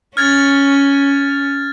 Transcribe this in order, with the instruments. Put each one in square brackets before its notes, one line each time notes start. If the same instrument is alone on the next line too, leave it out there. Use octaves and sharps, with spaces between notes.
[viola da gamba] C#4 [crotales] F6 G#6 A6